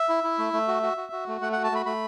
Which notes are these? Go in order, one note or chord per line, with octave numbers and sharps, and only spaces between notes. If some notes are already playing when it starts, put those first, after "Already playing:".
Already playing: E5
E4
E4
A3
A3
F#4
F#4
F#4
F#4
A3
A3 F#5
F#4 F#5
A5
A3 B5
A3 B5